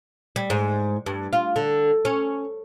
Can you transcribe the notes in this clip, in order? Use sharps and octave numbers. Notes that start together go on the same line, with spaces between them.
G3
G#2
G2
F4
D3
C#4